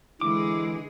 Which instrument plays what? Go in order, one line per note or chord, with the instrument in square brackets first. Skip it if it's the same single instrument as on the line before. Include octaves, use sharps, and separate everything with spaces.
[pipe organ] D3 E3 [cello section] G#3 G#4 [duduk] E4 [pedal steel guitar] D6